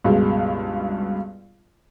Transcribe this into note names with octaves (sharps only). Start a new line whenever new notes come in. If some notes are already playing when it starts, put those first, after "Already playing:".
C#2 G2 B2 G#3